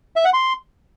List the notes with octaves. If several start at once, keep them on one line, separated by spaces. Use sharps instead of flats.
E5
F#5
C6